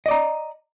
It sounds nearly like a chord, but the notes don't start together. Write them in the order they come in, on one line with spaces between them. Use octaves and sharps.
D#5 D5 A#5